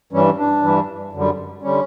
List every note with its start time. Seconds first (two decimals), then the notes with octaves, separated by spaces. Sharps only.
0.13 G2 E3 G3 C#4
0.38 D4
0.63 G2 E3 G3
1.13 F#2 D3 G3
1.62 D3 G3 C#4